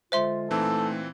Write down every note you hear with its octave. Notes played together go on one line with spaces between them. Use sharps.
D3 G#3 F4 C5 E5 C6
A#2 E3 A3 C4 D#4 A4